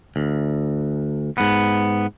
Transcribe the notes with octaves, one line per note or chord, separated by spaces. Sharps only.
D2
G#2 B3